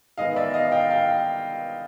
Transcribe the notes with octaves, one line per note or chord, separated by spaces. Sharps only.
D#3 G#3 B3 D#5 F5
D5 E5
D#5 F5
F5 G5
F5 G5